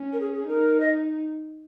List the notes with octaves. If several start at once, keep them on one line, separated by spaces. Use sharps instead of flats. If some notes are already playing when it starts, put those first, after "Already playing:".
Already playing: C#4
A#4
G#4
G#4
D#4 A#4
D#5